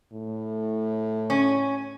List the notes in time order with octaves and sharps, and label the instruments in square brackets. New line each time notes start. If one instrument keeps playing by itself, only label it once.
[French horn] A2
[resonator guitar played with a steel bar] C#4